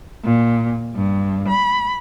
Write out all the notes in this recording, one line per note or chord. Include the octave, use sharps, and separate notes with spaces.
A#2
G2
B5